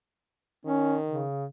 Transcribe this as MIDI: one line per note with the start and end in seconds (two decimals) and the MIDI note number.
0.65 1.23 51
0.65 0.96 61
1.07 1.45 49